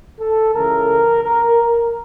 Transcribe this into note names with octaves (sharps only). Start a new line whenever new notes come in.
A4
C#2 C#3 E3 A#4
A#4